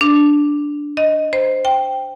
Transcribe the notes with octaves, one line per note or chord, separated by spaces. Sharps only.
D4
D#5
C5
G5